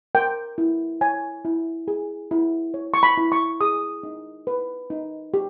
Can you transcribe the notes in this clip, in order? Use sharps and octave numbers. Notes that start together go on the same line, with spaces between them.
A#4 G5
E4
C#5 G#5
E4
G#4
E4
C#5
C#6
B5
E4
C#6
G#4 D#6
D#4
B4
D#4
G4